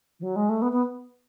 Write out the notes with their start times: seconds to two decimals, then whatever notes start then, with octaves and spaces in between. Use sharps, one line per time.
0.19 E3
0.22 F#3
0.35 G#3
0.49 A3
0.62 B3
0.72 B3